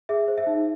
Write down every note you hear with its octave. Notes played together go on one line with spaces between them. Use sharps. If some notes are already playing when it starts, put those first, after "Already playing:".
G#4 E5
C5
E5
D#4